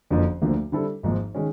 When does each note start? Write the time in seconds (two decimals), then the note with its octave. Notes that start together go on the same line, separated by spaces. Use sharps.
0.10 F#1 F2 D3 F3 A#3
0.42 D2 D3 F3 A#3
0.72 D3 G3 C4 E4 A4
1.03 G#1 G#2 F3 A#3
1.35 D#3 G#3 C#4